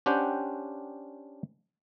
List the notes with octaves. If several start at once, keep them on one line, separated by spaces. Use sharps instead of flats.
C#4 D4 G4 C5 F#5 G5